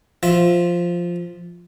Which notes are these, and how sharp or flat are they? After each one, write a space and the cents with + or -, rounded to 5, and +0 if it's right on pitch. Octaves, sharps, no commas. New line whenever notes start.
F3 +0 F4 +0 E5 +0